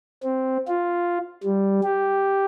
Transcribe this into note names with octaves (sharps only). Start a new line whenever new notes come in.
C4
F4
G3
G4